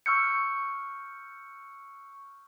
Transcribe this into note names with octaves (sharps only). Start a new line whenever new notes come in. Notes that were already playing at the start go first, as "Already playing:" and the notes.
C#6 E6 F6 G6 C#7